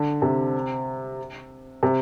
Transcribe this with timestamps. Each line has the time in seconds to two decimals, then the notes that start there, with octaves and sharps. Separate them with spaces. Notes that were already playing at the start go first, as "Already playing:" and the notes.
Already playing: D3
0.22 C3
1.83 C3